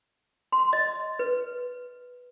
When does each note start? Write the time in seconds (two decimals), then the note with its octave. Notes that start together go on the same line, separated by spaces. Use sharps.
0.52 C6
0.73 D#5
1.19 B4